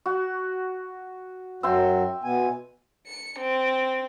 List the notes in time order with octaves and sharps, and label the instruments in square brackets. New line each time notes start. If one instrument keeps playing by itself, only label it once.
[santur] F#4
[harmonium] F#2 F#3 F#4 [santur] E5 G5 C6
[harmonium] B2 B3 G#5
[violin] C#7
C4